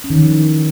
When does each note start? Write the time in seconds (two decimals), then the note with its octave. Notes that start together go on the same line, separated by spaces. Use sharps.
0.04 C#4
0.10 D#3
0.16 E3
0.22 F3